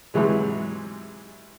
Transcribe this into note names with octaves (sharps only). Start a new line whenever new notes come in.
G#2 C3 E3 F#3 G#3